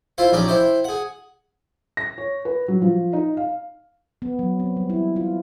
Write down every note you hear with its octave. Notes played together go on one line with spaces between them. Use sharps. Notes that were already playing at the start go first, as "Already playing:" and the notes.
E4 F4 C5 C6
A#1 C#4 D#4 G4 D5
E4 C5 G5
G#4 F#5
A#6
C#5
B4
F#3
F3
D#4
F5
B3
F#3
C4
G3
E4
F4